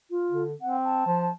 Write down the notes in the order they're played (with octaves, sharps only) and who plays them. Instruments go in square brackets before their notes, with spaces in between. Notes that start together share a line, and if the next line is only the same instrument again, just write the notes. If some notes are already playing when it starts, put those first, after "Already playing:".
[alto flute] F4
[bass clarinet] D3
[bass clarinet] C4 [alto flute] F#5
[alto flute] A5
[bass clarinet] F3